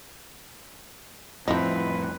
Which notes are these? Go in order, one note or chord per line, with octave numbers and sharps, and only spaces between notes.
F2 A2 F3 C4 D#4 E4 B4